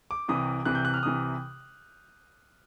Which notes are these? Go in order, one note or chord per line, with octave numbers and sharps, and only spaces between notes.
D6
C2 C3 E3 D#6
C2 C3 E3 F#6
G6
F#6
F6
C2 C3 E3 D#6